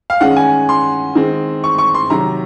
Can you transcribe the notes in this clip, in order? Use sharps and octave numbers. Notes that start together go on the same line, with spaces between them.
F5
D#3 G#3 C#4 F#5
G#5
C6
D#3 G#3 C4
C#6
C#6
C6
C3 D#3 F#3 A#5